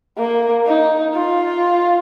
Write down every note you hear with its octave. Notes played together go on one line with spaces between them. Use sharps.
A#3
D#4
F4